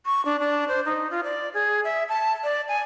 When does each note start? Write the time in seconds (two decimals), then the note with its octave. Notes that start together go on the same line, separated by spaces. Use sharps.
0.06 C#6
0.25 D4
0.40 D4
0.68 C5
0.86 D#4
1.11 F4
1.24 D5
1.54 G#4
1.84 E5
2.09 A5
2.44 D5
2.68 G#5